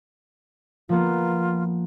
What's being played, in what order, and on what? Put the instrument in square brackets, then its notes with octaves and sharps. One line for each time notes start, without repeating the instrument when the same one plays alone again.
[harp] F3 A#3 B3 [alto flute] F4